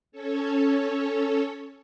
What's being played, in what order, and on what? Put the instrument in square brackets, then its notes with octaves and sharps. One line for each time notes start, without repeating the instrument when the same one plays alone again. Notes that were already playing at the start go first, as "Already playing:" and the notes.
[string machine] C#4 A4 C#5